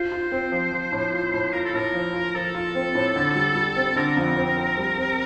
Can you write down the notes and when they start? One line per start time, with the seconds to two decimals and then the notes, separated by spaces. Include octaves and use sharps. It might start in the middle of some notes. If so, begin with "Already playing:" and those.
Already playing: F4 C5
0.12 F4
0.32 C4
0.52 F3
0.72 F3
0.92 A2
1.13 F4
1.33 A2
1.53 F4 A#4
1.65 A4
1.74 A2 A#4
1.94 F3
2.14 F4
2.34 F3 A4
2.55 F4
2.75 C4
2.95 A2
3.16 D3
3.35 G3
3.55 G3
3.76 C4
3.96 D3 A#4
4.17 F2
4.36 C4
4.58 C4
4.78 G3
4.98 C4